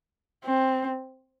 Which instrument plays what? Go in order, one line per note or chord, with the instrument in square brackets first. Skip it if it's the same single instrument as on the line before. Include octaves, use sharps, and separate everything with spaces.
[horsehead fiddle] C4